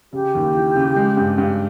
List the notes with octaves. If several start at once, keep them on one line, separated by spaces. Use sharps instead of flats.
C#3 G4
D#2
E3
C#3
G#3
G2
G2